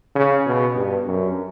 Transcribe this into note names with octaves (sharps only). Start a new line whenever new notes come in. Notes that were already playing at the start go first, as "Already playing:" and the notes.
C#3
B2
G2
F#2